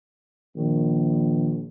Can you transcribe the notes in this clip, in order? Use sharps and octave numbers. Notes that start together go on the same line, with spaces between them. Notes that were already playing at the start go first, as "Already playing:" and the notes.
A#1 D#3